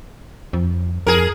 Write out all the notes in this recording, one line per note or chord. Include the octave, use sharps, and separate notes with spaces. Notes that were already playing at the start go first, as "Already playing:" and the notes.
F2
F2 G#4 A#4